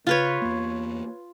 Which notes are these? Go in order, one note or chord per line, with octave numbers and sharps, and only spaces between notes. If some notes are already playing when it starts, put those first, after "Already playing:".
C#3 F4 B4 C#5
E2 A#3